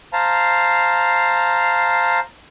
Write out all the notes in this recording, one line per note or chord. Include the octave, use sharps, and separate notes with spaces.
C5 F5 A5 A#5